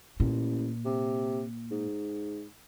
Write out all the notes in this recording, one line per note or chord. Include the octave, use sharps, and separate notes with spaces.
A1 A#2
C3
G#2